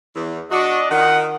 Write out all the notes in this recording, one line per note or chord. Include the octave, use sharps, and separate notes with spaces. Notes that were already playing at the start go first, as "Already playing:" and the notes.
E2
D4 F#4 D#5
D#3 F4 D#5 F#5